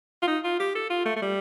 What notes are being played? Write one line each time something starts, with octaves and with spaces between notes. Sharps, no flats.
F4
D#4
F4
G4
A4
F4
A3
A3
G3